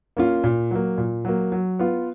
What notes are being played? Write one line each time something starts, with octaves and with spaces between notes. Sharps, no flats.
A#3 C#4 F4
A#2
F#3 A#3
A#2
F#3 A#3
F#3
B3 F4